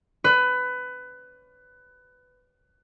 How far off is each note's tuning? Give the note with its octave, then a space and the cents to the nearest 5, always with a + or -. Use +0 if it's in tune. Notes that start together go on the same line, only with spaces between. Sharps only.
B4 +20